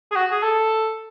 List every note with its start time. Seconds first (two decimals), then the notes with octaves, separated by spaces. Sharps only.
0.12 G#4
0.16 F#4
0.31 G#4
0.43 A4